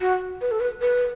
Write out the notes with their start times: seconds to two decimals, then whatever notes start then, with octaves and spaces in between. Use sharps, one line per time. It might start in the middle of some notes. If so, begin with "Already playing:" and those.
0.01 F#4
0.41 B4
0.51 A4
0.60 B4
0.82 B4